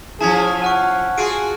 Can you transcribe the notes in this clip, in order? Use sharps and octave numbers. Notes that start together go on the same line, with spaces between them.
F3 C#4 E4 G#4 A5 G#6
F#5 C#6 F6 D#7
F4 F#4 G#4 D7 D#7